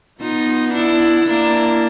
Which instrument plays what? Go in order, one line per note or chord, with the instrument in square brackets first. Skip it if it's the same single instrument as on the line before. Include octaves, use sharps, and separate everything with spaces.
[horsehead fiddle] B3 [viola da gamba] D#4 F4
[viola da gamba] D4 E4
[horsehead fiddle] A#3 [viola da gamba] D4 E4